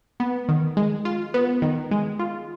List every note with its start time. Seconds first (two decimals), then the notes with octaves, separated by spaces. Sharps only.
0.20 B3
0.49 D#3
0.77 G#3
1.05 F4
1.34 B3
1.62 D#3
1.91 G#3
2.19 F4